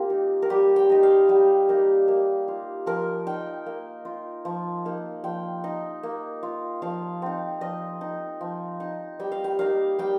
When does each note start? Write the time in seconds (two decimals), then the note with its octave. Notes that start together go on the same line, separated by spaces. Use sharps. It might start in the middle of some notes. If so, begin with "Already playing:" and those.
Already playing: A#3 C4 F4 G4 F5
0.10 D#4
0.42 A#4
0.50 G3 G4
0.76 G5
0.90 D#4 D#5
1.03 F5
1.29 G3
1.69 A#3 D#4
2.08 A#3
2.48 F4
2.86 F3 A#4
3.27 D#4 G5
3.66 A#3
4.05 F4
4.45 F3
4.85 A#3 D#4
5.24 F3 G5
5.64 D#4
6.03 A#3
6.43 F4
6.82 F3 F5
7.22 C4 D#4
7.61 F3 D#5
8.01 D#4
8.41 F3
8.80 D#4
9.19 G3 G5
9.32 F5
9.44 G5
9.59 A#3 D#4 F5
9.99 G3 G5